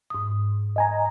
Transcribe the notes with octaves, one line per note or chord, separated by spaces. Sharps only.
G#2 D#6
D#5 G#5 A#5